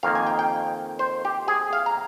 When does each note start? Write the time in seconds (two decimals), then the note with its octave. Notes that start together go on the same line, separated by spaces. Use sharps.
0.03 F2 D#3 A#3 F5
0.15 G#5
0.27 G5
0.39 G5
0.99 C5
1.25 G4
1.48 G#4
1.73 F5
1.86 A#5